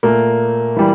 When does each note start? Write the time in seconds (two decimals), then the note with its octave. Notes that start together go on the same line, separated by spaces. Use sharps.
0.03 A#2 A3 A#3
0.76 E3 G3